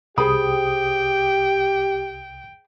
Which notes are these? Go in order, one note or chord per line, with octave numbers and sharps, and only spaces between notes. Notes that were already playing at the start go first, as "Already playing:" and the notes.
C2 G4 G#4 C5 G5 B5 D#6